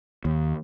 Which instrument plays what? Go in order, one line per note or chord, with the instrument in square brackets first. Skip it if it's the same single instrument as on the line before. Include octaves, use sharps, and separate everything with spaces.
[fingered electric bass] D#2